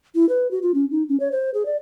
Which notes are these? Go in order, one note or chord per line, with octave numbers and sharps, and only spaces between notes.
E4
B4
F#4
F4
C#4
D#4
C#4
C#5
C5
G#4
D5